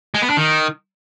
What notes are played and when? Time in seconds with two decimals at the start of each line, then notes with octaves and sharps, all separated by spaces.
0.14 G#3
0.22 B3
0.30 D4
0.37 D#3